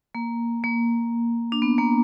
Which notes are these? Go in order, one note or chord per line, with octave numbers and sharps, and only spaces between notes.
A#3
A#3
D4
B3
A#3